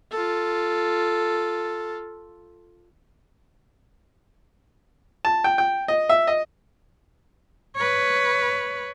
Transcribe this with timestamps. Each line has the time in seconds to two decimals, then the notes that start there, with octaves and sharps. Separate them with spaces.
0.11 F4 A4
5.25 A5
5.44 G5
5.58 G5
5.88 D#5
6.09 E5
6.27 D#5
7.76 B4 C#5